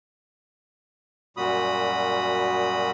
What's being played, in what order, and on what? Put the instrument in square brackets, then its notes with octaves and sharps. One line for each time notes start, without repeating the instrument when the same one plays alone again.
[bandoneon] F#2 A#2 G3 F#4 B5 D#6